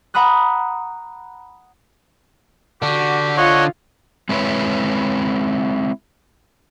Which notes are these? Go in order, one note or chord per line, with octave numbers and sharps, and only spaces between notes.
F#5 A#5 B5 D#6 F#6
D3 D4 F#4 G4
F4 C#5 D#5 F#5 C#6
G#3 C4 E4 A#4 B4 C#5